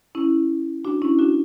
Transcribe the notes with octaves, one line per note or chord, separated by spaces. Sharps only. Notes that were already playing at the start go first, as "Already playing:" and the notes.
C#4 E4
D4 F#4
C#4 E4
D4 F#4